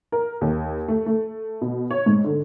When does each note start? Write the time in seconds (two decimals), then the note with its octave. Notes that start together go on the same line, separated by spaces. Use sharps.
0.12 A#4
0.41 D#2
0.88 A3
1.06 A3
1.62 B2
1.91 C#5
2.06 G#2
2.24 D3